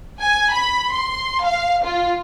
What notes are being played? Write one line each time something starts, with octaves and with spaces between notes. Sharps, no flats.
G#5
B5
C6
F5
F4